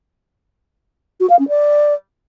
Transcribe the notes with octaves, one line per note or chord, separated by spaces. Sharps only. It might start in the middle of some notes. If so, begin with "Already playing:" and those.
F#4
F5
C#4
D5